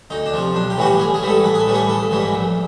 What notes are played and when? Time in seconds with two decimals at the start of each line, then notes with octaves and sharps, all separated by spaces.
0.10 D2 D#4
0.26 D4
0.33 C3 F3
0.55 B1 D4
0.70 G4
0.77 A2 E3 G3 F#4
0.85 G4
0.99 A1 G#4
1.14 G#4
1.22 G#2 E3 G3
1.29 A4
1.44 A1 B4
1.54 G#4
1.60 A4
1.67 A2 E3 G3
1.74 G#4
1.88 A1 A4
2.11 G#2 E3 G3
2.34 A#1